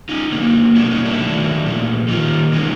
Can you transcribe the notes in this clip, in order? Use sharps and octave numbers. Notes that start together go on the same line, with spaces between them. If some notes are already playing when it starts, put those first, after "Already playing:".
C#4 D#4
D3 F#3 A#3
B2 G3 A#3 D4 E4
C#4 D#4
D4 E4
D#3 F#3 A3
A#2 F3 A3
D#3 G3 A#3 D#4 F4
C3 E3 G#3 C#4 D#4